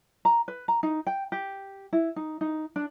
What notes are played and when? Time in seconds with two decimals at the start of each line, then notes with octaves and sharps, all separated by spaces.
0.25 A#5
0.48 B4
0.68 A#5
0.83 D#4
1.07 G5
1.32 G4
1.93 E4
2.16 D#4
2.41 D#4
2.76 D4